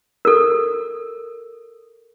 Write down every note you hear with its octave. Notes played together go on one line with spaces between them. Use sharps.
A4 A#4